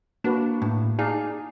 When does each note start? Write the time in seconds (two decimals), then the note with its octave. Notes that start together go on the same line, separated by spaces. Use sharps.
0.24 A#3 D4 F#4 B4
0.62 A2
0.99 D#4 G#4 D5 F5 A5